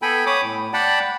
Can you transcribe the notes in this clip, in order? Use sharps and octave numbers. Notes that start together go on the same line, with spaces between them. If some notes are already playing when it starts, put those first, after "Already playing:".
B3 A4 G5 G#5 B5
C#5 B5 D6 D#6
A2
D5 F#5 G5 A5 B5